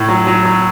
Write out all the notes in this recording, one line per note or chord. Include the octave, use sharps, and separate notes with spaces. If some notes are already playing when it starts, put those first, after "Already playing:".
Already playing: A2
F#3
F#3
F#3